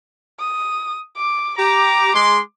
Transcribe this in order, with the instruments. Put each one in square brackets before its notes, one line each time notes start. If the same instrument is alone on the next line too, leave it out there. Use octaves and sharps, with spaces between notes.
[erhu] D#6
D6
[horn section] G4 A#5 [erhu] D6
[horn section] G#3 C6